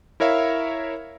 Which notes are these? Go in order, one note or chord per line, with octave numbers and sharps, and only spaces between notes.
E4 A#4 C#5 E5 F5